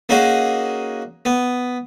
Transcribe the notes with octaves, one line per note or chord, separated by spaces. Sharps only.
A#3 C#4 D#4 F#4 G#4
B3